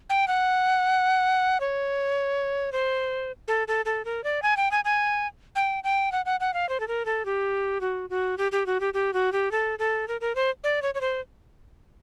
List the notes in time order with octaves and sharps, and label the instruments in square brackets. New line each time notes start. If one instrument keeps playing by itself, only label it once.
[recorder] G5
F#5
C#5
C5
A4
A4
A4
A#4
D5
G#5
G5
G#5
G#5
G5
G5
F#5
F#5
F#5
F5
C5
A4
A#4
A4
G4
F#4
F#4
G4
G4
F#4
G4
G4
F#4
G4
A4
A4
A#4
A#4
C5
D5
C#5
C#5
C5